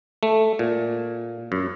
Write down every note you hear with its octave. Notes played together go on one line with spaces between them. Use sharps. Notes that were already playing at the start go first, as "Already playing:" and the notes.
A3
A#2
F#2